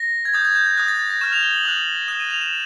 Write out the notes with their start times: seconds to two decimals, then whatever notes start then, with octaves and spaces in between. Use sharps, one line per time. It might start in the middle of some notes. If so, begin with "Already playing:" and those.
Already playing: A#6
0.25 G#6
0.33 D#6 G6 A6
0.45 G#6
0.55 G6
0.66 G#6
0.77 D#6 F#6 A6
0.88 A6
0.99 A6
1.10 A#6
1.21 C#6 F6 E7
1.33 F7
1.42 G7
1.54 F#7
1.65 D#6 F#6 F7
2.08 D#6 F#6 E7
2.20 D#7
2.30 F7
2.41 E7